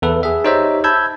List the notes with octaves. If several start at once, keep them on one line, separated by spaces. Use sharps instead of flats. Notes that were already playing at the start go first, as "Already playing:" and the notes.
E2 A4 B4
G#4 E5
D#4 G4 C5 C#5 D#5 E5
A5 B5 E6 G6 G#6